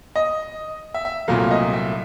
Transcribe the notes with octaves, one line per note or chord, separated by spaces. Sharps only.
D#5
E5
E5
C2 A#2 F#3 A3 F5
D#5
E5